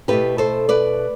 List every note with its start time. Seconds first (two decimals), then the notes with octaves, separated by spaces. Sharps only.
0.08 B2 A3 E4 G4 B4
0.38 A4 C5
0.69 B4 D5